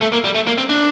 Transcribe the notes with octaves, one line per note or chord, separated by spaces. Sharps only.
A3
A#3
G3
A3
A#3
C4
D4